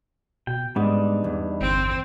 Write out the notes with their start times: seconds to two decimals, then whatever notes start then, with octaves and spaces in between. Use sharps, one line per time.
0.47 B2 G5
0.76 G#2 G3 B3 D4 D#4
1.24 E2
1.61 G1 C4